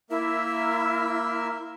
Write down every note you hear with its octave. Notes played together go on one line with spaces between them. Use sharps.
A#3 E4 A#4 E5